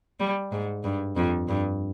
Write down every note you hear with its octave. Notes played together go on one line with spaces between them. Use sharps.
G3
G#2
G2
F2
G2